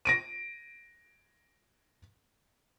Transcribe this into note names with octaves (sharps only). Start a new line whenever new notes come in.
A#6 D7 D#7